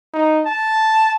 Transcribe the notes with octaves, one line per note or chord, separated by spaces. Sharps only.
D#4
A5